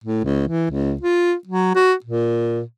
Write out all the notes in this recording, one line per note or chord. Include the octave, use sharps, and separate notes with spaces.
A2
C#2
E3
C#2
F4
F#3
F#4
A#2